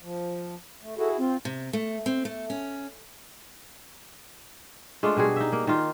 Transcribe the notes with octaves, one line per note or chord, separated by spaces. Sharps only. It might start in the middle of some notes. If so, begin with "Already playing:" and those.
F3
A3
E4 F#4 G#4 A4
C4 F4
C3
A3
C4
A3
C#4
G#3 A3 D4 F4
B2 G3 F#4 G#4
D#4 E5
A#3
D#3 A#3 F4